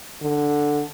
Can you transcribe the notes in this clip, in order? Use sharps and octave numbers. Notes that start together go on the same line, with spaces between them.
D3